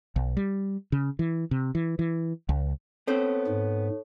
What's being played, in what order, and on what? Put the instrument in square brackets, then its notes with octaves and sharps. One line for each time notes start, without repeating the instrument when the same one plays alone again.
[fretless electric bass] B1
G3
C#3
E3
C3
E3
E3
C#2
[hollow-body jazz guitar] B3 C4 C5 [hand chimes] A4 C#5
[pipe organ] G#2